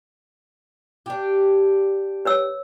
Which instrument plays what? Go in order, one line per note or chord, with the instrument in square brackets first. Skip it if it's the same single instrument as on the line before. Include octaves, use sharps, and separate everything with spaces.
[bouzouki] D4 G4
[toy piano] B4 C#5 E6